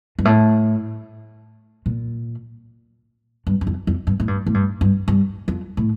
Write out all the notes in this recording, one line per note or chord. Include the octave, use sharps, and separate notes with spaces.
G2
A2
A#2
G2
G2
F2
F2
G2
A2
G2
A2
G2
G2
G2
F2
A2